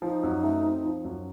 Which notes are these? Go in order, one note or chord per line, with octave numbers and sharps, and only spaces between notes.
F3 D#4
F#2
A3
C4
F3
F#2